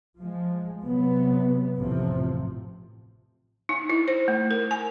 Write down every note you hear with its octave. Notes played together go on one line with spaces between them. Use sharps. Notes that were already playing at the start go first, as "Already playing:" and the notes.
F3 G#3
C3 F#3 B3
A1 F2 A2 C3 F3
D#4
E4
C5
A3
A#4
G#5